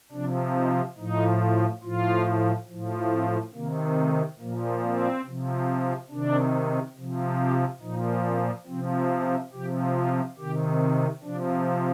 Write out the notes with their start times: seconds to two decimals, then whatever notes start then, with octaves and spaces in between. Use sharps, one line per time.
0.12 C3 F3 D4
0.55 D#4
0.98 A2 F3 D#4
1.83 A2 F3 F4
2.69 A2 F3
3.12 C4
3.54 C3 D#3 A#3
3.97 A3
4.40 A#2 F3 A#3
4.83 C4
5.25 C3 F3
6.10 C3 D#3 D4
6.97 C3 F3
7.39 G4
7.82 A#2 F3 D#4
8.25 C4
8.67 C3 F3 C4
9.11 C4
9.53 C3 F3 G4
9.96 F4
10.38 C3 D#3 G4
11.24 C3 F3 D4